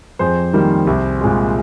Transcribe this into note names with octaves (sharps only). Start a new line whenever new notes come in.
F2 G#4 C5
D#3 G3 A#3
C2
A#2 G#3